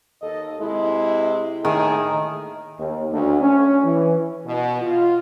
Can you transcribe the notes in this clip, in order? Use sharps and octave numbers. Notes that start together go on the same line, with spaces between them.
D#2 A4 D#5
C3 G#3 E4
A2 D#3 A3 G#4
D#2
D2
C#4
E3
B2
F4